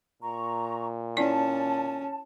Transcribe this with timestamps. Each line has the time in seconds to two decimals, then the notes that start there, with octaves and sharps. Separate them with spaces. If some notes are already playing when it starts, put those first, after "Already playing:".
0.23 A#2 A#5 C#6
1.17 C#4 E4 D5 A5